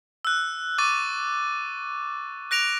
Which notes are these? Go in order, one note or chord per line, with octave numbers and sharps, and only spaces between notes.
E6 F#6
C#6 D6 E6 F#6 A6 D#7
F#6 A#6 D7 F7